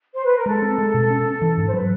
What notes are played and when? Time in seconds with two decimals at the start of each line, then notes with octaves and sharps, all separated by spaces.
0.14 C5
0.25 B4
0.36 A#4
0.46 G#3 A4
0.62 C4
0.78 G#3
0.94 B2
1.10 C#4
1.26 C#4
1.42 E3
1.58 G#2
1.67 C5
1.74 F#3 B4